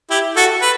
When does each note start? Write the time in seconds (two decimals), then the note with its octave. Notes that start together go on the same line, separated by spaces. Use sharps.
0.10 E4 G4
0.36 F#4 A4
0.62 B4